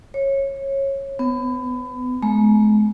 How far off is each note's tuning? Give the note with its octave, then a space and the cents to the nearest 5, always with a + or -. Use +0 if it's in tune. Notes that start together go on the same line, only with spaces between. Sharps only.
C#5 -20
B3 +30
G#3 +40